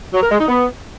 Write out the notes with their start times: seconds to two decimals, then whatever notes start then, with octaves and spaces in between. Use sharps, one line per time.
0.14 F#3
0.22 A#4
0.31 G#3
0.40 D#4
0.48 B3